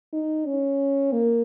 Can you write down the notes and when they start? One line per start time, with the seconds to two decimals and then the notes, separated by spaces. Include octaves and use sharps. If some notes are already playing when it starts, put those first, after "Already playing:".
0.13 D#4
0.46 C#4
1.12 A#3